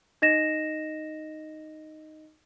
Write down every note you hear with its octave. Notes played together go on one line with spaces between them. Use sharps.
D#4 D#5 A#6 E7